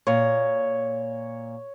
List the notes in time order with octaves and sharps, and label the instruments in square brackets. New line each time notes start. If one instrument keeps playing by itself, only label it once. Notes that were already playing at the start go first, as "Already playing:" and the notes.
[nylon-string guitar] A#2 [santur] C#5